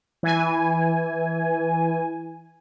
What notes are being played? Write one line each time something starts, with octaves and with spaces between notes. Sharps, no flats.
E3 G#5